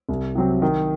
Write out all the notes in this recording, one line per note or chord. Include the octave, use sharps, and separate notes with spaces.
C2
C3 F#3 C4
D#3